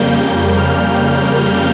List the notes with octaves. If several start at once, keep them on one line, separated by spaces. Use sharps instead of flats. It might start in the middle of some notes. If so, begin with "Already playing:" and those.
Already playing: F2 C#3 G3 A#3 G6
F6